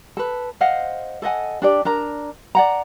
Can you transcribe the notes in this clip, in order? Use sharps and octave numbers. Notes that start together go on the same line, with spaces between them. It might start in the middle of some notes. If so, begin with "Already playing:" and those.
A4 B4
C5 D#5 F5 F#5
A4 D#5 F#5 G#5
D4 G4 D5
D4 A#4 A#5
D5 F#5 A#5